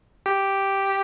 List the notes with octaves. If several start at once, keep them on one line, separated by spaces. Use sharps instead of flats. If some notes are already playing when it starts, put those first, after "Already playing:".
G4